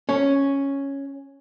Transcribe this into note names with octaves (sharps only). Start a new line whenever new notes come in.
C#4